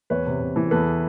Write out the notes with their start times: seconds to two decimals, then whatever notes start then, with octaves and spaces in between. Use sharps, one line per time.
0.10 E2 B4 C#5
0.27 C3
0.41 C3
0.56 E3
0.71 E2 A4 B4